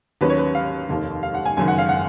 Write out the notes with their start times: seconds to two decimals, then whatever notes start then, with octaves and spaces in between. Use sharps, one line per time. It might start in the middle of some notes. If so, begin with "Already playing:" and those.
0.21 D#2 D#3 F#3 C#4 B4
0.30 C#5
0.38 B4
0.55 F5
0.89 F1 D#2 D#3
1.23 F5
1.34 F#5
1.45 G#5
1.57 F#1 F#2 D#3 G#5
1.68 F#5
1.78 F5
1.89 F#5